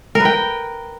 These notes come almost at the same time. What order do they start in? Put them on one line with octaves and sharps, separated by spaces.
A#4 B4 G5